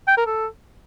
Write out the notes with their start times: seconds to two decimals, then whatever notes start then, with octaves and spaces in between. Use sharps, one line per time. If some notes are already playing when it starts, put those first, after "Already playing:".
0.08 G5
0.17 A#4
0.27 A4